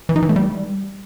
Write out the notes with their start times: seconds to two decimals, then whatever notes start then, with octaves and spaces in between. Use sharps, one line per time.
0.09 E3
0.16 D#4
0.22 E3
0.29 A3
0.36 G3